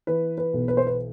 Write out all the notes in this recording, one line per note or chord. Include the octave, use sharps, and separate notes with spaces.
E3 B4
B4
B1
B4
C5
B4